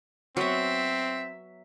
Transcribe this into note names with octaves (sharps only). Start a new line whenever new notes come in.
F#3 B3 C4 E5